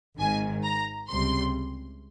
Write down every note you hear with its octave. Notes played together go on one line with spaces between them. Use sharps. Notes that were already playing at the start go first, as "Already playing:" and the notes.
G#1 G#2 D#3 G#5
A#5
C#2 C3 G3 C6